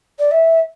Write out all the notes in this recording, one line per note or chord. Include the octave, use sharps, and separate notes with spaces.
D5
E5